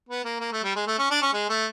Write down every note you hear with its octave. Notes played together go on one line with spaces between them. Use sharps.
B3
A#3
A#3
A3
G3
G#3
A3
C#4
D4
C#4
G#3
A3